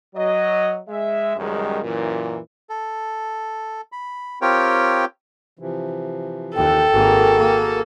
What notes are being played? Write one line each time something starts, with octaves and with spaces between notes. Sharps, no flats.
F#3 D#5
G#3 E5
C#2 F#2 D#3 G3 G#3
F#2 A#2 E3
A4
B5
C4 F4 G4 A#4 C#5 G5
C3 E3 F3
D#2 A4 G5
G#1 A#3 F#4 G#4 A#4
A#3